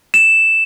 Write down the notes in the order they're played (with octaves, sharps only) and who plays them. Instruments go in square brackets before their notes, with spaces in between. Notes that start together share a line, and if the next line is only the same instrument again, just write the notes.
[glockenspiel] E7